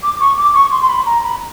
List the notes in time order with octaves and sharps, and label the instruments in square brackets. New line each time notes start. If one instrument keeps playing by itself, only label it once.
[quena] D6
C#6
D6
C#6
C6
C6
B5
A#5
B5